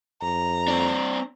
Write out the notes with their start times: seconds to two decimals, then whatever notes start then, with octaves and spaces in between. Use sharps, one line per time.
0.22 F2 A#5
0.68 C4 D4